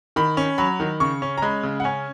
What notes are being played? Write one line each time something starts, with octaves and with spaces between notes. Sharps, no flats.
D#3 B5
C#4
F#3 B5
D#3
C#3 C#6
C#4
A#5
G#3 B5
C#3
F#5
C#4 G#5